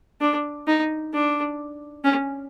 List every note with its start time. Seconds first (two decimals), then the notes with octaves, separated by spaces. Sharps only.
0.21 D4
0.67 D#4
1.13 D4
2.04 C#4